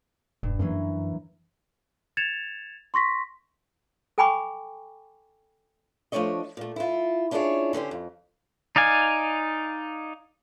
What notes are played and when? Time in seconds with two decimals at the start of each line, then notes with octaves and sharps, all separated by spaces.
0.43 E1 G2
0.59 F#2 E3 F#3 A#3
2.17 G#6 A6 C#7 E7 F7
2.94 C6 C#6 A#6 B6
4.18 A4 G5 G#5 B5 C#6 D6
6.12 F3 A3 C#4 D4 C#5 D#5
6.57 A#2 A3
6.76 E4 F4
7.31 C#4 D4 E4 F4 G#4 C#5
7.73 D3 C#4 G4 C5
7.91 F2
8.76 D#4 D5 F5 G#5